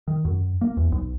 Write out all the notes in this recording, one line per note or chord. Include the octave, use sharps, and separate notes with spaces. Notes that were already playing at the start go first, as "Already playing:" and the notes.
D#3
F#2
A#3
E2
B1